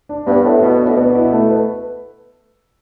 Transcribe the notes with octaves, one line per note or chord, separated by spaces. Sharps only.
D4
G2 B3
A2 A4
B2 B3
D4
A2
B2
B3
E4
A3
B4